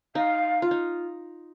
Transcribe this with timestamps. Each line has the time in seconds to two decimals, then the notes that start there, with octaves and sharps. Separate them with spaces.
0.15 D#4 F5
0.62 F4
0.71 D#4